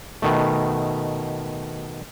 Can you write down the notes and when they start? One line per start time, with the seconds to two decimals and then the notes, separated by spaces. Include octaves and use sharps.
0.22 B2 D#3 A3